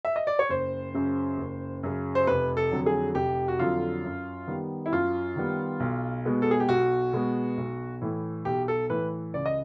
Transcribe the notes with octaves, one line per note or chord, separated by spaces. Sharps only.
E5
D#5
D5
C#5
F#1 C5
F#2 C#3
F#1
F#2 C#3
C5
F1 B4
A4
F2 D3 F#3
G#4
F1 G4
F#4
F2 D3 F#3 F4
F#2
D#3 G3 B3
E4
F#2 F4
D#3 G3 B3
B1
B2 G#3 B3
A4
G#4
G4
B1 F#4
B2 G#3 B3
B1
A2 E3
B1 G4
A4
A2 E3 B4
C#2 D5
D#5